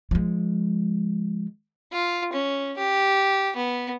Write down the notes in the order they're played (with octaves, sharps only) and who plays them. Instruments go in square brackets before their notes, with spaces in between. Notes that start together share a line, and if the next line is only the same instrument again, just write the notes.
[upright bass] F3 G#3
[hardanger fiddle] F4
C#4
G4
B3